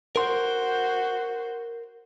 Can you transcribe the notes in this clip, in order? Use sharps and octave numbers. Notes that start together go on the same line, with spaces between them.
F#4 A#4 C5 C6